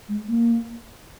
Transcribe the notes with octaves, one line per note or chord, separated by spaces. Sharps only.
G#3
A#3